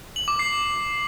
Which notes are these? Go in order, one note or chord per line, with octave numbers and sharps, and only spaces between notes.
F#7
D6
C7